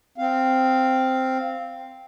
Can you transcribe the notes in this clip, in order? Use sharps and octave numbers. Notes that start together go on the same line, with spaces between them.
C4 F5